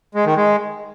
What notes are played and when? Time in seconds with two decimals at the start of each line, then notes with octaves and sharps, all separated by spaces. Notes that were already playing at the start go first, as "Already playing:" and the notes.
0.15 G#3
0.25 D#3
0.36 G#3